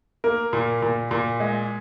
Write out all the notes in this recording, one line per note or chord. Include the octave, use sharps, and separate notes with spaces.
A#3 A#4
A#2
A#2
A#2
G#3